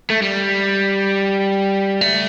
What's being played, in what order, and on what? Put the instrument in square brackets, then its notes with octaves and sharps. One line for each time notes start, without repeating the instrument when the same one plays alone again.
[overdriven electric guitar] A3
G3
A3